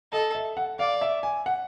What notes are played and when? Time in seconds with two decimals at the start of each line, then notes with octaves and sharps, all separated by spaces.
0.12 A4 D#5
0.35 E5
0.57 F#5
0.79 D5 F5
1.01 E5
1.23 G#5
1.46 F#5